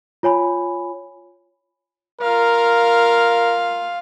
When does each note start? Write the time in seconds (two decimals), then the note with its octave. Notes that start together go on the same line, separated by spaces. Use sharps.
0.23 F4 C#5 G#5 B5
2.21 F4 A#4 F5